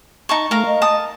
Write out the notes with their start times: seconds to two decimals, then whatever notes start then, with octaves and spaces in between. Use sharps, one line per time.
0.29 D#4 A5 C#6
0.51 A3 A#4 F5 A#5
0.66 D#5
0.82 A5 D#6